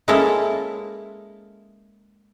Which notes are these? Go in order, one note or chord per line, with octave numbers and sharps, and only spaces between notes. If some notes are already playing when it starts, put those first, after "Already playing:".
G#3 A#3 C#4 E4 A4 C#5